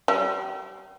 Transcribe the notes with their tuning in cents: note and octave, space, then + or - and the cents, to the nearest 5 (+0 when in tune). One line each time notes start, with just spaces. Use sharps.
G3 -40